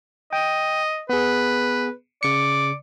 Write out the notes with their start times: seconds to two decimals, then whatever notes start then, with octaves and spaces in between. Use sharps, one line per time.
0.33 D#5 G5
1.09 B3 G#4 B4
2.23 C#3 D5 C#7